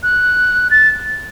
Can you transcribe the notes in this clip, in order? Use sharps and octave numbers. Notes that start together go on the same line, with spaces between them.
F#6
A6